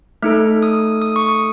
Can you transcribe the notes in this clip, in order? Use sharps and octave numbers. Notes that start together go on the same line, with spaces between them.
A3 D#4 A4 F6
D#6
D#6
C#6
D#6